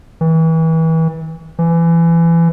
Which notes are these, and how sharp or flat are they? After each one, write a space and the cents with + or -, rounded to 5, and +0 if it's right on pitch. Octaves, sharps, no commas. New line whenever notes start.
E3 -30
E3 +25